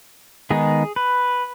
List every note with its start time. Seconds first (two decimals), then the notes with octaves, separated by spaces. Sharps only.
0.50 D#3 G#3 B3 D#4 G#4
0.96 B4